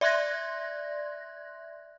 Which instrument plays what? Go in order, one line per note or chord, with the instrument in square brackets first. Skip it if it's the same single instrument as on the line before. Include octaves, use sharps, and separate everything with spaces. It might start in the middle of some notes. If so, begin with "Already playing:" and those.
[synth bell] D5 E5 C6 F#6 G#6 A#6